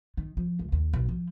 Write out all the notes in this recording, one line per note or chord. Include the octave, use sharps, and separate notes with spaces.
D#3
F3
C#2
D#2
B1
F3